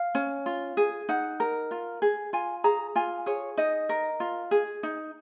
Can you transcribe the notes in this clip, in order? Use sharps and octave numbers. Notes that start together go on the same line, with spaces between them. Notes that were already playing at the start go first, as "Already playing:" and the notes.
Already playing: F5
C#4
F4
G#4
D#4 F#5
A#4
F4
G#4
F4 G#5
G#4 A#5
F4 G#5
G#4 C#5
D#4 D#5
A#4
F4
G#4
D#4